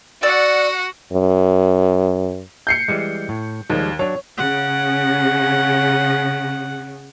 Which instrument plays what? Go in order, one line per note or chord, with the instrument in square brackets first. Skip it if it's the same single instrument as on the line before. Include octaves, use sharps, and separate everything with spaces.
[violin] F#4 F#5 [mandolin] D5 E6
[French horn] F#2
[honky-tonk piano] G6 C7 C#7
[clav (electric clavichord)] E3 G3 G#3
A2
[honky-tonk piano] D#2 [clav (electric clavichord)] F3 G3 G#3
[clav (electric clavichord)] F#3 D4 [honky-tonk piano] C#5
[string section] C#3 [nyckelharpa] F#5